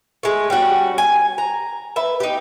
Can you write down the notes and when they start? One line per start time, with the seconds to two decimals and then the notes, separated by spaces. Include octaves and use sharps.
0.23 G#3 A3
0.50 G3 C#4 F#4
0.98 G#5
1.38 A#5
1.96 B4 E5
2.20 D#4 G4